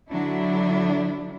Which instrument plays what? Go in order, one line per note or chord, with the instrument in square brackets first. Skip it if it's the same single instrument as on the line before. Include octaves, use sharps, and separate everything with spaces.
[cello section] D3 F#3 D4 E4